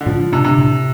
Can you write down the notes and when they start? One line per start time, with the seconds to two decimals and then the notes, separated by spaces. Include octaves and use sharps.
0.01 D3
0.06 A2 F3
0.20 F3
0.32 C3 D4
0.44 C3
0.58 A2